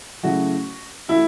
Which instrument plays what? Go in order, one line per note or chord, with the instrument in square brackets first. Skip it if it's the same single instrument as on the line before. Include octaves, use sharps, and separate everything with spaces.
[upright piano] C#3 F#3 A3 C#4 E4 [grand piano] F#4
[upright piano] E3 A3 F#4 A4 [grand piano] E4